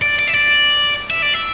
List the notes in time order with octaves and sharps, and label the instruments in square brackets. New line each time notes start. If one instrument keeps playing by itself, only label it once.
[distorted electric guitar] D5
D5
E5
D5
E5
D5
E5